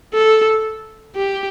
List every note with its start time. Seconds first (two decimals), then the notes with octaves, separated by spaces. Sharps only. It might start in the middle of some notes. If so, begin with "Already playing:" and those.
0.14 A4
1.16 G4